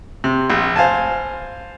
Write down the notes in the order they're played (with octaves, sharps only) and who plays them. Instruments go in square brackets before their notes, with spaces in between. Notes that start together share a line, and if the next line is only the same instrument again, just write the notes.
[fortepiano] C3
A#1
C5 F5 G#5 A5